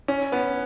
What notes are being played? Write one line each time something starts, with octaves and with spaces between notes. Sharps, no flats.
C#4
B3